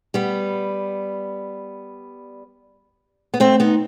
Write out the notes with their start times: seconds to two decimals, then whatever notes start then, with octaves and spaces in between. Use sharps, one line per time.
0.14 G3 B3
3.34 B3
3.40 A3 C4
3.60 B3 D#4